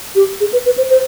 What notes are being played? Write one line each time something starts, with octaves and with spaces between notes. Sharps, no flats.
G4
G#4
B4
B4
C5
C5